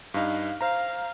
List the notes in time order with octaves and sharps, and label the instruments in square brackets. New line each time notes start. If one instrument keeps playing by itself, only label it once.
[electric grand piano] G2 D#4 [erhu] F5
[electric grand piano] C5 A#5 [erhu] F5